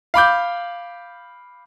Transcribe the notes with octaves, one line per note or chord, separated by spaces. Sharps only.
F5 B5 D6 G6